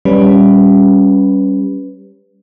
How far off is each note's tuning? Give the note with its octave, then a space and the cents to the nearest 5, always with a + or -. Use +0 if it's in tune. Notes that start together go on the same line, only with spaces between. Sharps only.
G3 +10 C#4 +0 B4 +0